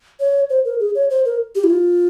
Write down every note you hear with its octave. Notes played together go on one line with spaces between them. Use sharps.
C#5
C5
A#4
G#4
C#5
C5
A#4
G4
E4
F4